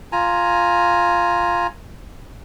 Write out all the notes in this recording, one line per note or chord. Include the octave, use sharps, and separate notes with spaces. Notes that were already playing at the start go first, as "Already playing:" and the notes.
F4 G#5 A#5